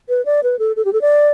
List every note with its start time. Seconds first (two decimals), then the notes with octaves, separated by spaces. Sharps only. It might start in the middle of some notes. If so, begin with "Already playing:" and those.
0.09 B4
0.25 D5
0.43 B4
0.59 A4
0.76 A4
0.85 G4
0.93 A4
1.01 D5